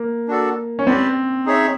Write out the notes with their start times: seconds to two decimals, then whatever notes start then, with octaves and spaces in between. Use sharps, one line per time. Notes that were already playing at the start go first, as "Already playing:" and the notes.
Already playing: A#3
0.28 D4 F#4 A4 D5
0.79 C#4
0.87 C4 G4 B4 D5
1.46 D#4 G#4 C#5 E5